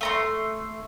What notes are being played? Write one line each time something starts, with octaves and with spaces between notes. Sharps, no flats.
A3 A#5 C6